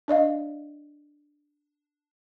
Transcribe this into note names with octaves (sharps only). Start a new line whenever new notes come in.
D4 D5 D#5 F5